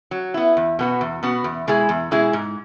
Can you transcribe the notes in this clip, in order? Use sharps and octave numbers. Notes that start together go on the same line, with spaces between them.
F#3
B3 E4
E2
B2 B3 F#4
E2
B2 B3 F#4
E2
B2 G#3 E4 G#4
E2
B2 G#3 E4 G#4
G#2